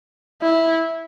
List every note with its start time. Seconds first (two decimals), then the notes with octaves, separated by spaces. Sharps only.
0.42 E4